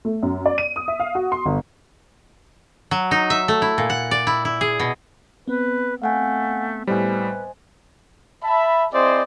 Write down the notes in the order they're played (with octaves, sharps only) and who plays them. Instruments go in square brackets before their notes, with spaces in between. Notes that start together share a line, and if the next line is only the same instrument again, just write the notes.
[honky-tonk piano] A3
F#2
D5
D#7
D#6
E5
F5
F#4
C6
G1
[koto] F#3
D#4
E5
A3
E4
A#2
F#5
D5
E4
E4
G#4
B2
[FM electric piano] B3 C4 [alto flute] B4
[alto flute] A3 [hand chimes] F5 F#5 G#5
[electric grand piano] A2 G3 [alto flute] B4 [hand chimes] C5 D#5 G#5
[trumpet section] E5 A5 B5
C4 E4 G#4 C5 D5 D#5